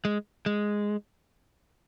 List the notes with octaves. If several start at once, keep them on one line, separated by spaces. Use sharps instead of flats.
G#3
G#3